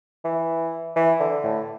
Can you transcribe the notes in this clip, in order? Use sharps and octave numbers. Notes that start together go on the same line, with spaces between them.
E3
E3
D3
A2